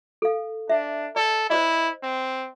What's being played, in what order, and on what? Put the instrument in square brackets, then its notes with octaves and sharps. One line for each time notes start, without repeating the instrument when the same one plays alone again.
[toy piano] A4 F5
[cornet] D4 [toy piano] E5
[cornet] A4 [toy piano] D5
[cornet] E4 [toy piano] C5 D5 D#5
[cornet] C4